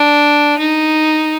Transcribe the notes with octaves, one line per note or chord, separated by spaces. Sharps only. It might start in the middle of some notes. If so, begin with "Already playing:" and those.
Already playing: D4
D#4